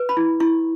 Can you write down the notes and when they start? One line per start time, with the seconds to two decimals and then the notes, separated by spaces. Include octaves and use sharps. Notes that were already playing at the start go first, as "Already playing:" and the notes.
Already playing: B4
0.09 B5
0.17 E4
0.40 E4 C#6